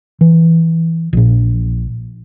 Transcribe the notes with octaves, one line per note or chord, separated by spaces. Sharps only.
E3
A#1 A#2